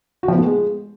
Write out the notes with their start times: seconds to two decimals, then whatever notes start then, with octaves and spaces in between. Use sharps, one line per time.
0.23 F#4
0.28 F3
0.33 B3
0.39 A3
0.44 G#3